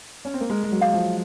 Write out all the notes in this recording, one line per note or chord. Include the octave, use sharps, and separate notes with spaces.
C#4
C4
A#3
G#3 A#4
G#3
F#3
F5
F3